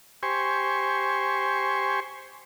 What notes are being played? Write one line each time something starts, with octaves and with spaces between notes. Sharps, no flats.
G4 C5 G#5 C#6